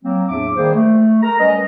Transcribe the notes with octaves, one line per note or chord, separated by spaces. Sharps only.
F#3 A#3 C4
E2 A2 D4 E5 D6
D#3 G3 A#3 G#4 C5
A3
A4 A#4 A#5
G3 C#4 B4 D#5